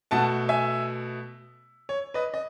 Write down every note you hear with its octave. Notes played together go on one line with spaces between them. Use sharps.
B2 A3 F#5 A5
E5 G#5
C#5
B4 D#5
D#5